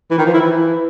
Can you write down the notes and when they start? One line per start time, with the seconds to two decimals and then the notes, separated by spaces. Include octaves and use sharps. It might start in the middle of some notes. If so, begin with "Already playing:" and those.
0.11 E3
0.18 D#3
0.26 F3
0.34 E4
0.42 E3